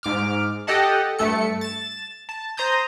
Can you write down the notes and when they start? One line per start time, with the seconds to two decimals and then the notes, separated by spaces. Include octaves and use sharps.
0.03 G#2 D6 F6
0.67 G4 A4 D#5 F#5 A5
1.19 G2 A3 A4 C#7
1.61 A6 E7
2.29 A5
2.57 C5 A#5 D#6 G6